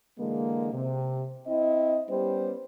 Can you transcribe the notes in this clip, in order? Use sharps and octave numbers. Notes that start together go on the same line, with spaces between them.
D3 E3 G#3 A#3
C3
C4 E4 D#5
G3 B3 C#4 G4 C5